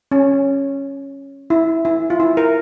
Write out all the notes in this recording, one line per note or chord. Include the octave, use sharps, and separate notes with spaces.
C#4
E4
E4
F4
E4
A#4